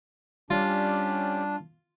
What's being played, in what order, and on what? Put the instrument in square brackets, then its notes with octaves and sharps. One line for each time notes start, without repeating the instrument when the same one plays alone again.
[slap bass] G3 [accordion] C#4 G4 D5 [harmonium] D4 [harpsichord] F4